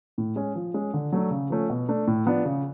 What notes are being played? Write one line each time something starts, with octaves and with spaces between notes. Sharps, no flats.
A2
G#3 C#4
F3
G#3 C#4
D3
F#3 A3 D4
C#3
F3 A3 C#4
B2
A3 D4
A2
F3 B3 D4
C#3